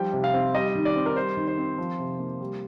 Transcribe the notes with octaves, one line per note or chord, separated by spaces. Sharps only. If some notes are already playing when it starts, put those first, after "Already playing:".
Already playing: F3 G3 G5
C3
F5
C4
G3 D#5
D#3
D5
C4
A#4
G3 C5
D#3
C5
C4
F3
C3
A#3
G3